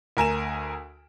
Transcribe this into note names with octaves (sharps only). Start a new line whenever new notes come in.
D2 A#4 G#5 E7